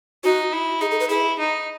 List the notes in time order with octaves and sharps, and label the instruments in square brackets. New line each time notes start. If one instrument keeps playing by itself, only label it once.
[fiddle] D#4 [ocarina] F#4
[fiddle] E4
[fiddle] D#4 [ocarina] G#4
[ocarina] A4
B4
[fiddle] E4 [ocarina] G#4
[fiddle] D#4